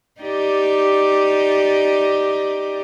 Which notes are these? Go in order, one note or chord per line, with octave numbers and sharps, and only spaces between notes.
D#4 G4 D5